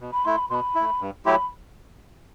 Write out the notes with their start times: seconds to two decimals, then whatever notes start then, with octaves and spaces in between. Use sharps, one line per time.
0.01 B2
0.13 B5
0.25 A3 E4 C6
0.38 B5
0.50 B2 B5 C6
0.75 E4
0.80 A3
1.00 G2
1.25 F#3 A3 E4 G4 B5 C6